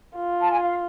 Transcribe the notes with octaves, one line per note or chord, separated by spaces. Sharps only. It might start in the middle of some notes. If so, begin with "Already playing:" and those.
F4
A5
G#5
F5